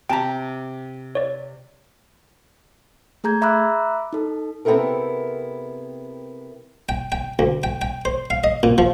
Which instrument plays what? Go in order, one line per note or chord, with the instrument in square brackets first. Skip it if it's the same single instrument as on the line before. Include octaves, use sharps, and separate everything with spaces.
[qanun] C3 G4 [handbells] G5 A5 A#5
[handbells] C#5 D5
[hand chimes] A3 G#4 A#5 G6 G#6
E5 A#5 B5 D6 E6 F#6
D#4 A4
[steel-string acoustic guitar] C3 B3 C4 E4 A4 A#4
[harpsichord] G5
G5
D2
G5
G5
C5
F5
D#5
A#2
F3